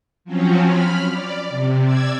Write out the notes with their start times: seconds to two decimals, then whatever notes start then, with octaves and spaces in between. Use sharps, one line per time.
0.25 F3 F#3 C4 C#4
0.62 B5 F6
1.09 D5
1.49 C3
1.84 D5 E6 G#6